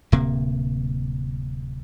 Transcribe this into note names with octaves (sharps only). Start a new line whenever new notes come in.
D1 C3 A#3